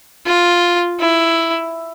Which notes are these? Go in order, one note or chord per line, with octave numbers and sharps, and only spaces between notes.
F4
E4